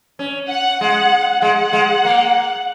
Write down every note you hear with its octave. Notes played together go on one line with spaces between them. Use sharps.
C#4
F#5
G#3 F#5
G#3 F#5
G#3
A#3